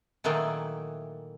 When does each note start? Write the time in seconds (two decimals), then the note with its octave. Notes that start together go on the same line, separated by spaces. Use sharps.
0.24 A#2 D#3 E3 F#3 A3